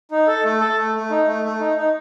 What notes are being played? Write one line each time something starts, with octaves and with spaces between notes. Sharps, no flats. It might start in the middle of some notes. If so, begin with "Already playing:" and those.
D#4
A4
A3
A4
A3
A3
D#4
A3
A3
D#4
D#4